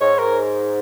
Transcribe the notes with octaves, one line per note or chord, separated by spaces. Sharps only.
G#2 C#5
A#4